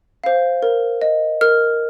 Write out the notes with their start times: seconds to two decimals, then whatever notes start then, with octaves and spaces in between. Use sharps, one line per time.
0.24 C5 F5
0.63 A#4
1.02 D#5
1.41 A#4 F6